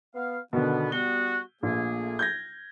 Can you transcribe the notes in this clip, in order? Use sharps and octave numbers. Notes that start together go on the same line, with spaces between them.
B3 F5
B2 D3 D#3 B3
G3 B3 F#4 G7
A#1 A3 A#3 G#4
G6 G#6 A#6